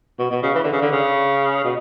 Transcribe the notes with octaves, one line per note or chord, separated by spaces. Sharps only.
B2
B2
C#3
E3
D3
C#3
D3
C#3
B2